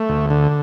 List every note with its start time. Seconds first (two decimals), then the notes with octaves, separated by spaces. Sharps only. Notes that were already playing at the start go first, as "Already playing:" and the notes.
Already playing: A3
0.09 D2
0.30 D3